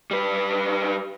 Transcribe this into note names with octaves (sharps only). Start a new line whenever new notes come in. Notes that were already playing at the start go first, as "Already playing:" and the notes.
G3 B4